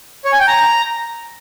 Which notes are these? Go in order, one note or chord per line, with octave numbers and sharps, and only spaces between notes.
C#5
G#5
G5
A#5